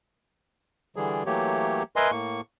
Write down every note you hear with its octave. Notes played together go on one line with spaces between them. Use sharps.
D3 E3 G3 G#4
E3 F#3 A3 A#3 G4 C#5
A#4 B4 D#5 E5 G#5 C6
A2 A#3 C#6